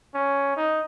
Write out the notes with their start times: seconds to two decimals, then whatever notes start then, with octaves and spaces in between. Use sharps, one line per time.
0.14 C#4
0.56 D#4